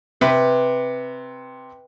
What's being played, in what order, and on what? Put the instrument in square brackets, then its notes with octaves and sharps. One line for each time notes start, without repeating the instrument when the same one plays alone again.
[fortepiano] C3 [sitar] B4